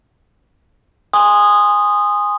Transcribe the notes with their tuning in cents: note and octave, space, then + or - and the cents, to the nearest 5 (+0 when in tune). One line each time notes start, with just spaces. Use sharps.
G#5 -15 C6 +5 D#6 -10